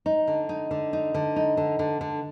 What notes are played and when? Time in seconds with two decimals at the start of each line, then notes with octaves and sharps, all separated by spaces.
0.06 D#4
0.27 D3
0.49 D#4
0.71 D3
0.93 D#4
1.14 D3
1.36 D#4
1.57 D3
1.79 D3
2.01 D3